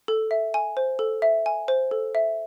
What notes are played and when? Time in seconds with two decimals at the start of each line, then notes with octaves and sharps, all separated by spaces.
0.08 A4
0.31 E5
0.54 G#5
0.77 C5
0.99 A4
1.22 E5
1.46 G#5
1.68 C5
1.91 A4
2.15 E5